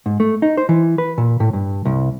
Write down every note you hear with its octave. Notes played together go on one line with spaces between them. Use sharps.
G#2
A3
D#4
C5
E3
B4
A#2
A2
G2
C2